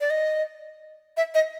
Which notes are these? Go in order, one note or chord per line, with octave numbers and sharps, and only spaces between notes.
D5
D#5
E5
D#5